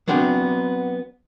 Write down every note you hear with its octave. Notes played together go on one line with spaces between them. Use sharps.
F#3 B3 C4 D4 G#4